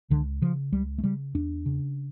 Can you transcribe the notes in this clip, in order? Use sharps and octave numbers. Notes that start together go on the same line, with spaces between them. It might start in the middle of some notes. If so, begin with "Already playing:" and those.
C#2 D3
C#3 F3
C#2 G3
A3
C#3 G3
E2 D4
C#3